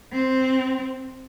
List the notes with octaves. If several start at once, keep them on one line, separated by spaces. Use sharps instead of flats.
C4